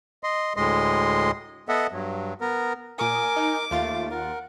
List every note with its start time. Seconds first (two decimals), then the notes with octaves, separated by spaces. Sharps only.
0.23 D#5 C6
0.57 D2 A2 G#3 D#5 C6
1.69 B3 A4 D#5 E5 F#5
1.92 G2 F#3
2.41 B3 A#4
2.99 A#2 A#4 G#5 D6 D#6
3.36 D#4
3.71 D#2 A3 F4 F5 A6
4.11 A#4 F#5